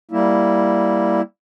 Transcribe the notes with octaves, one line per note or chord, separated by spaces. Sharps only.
G3 A#3 E4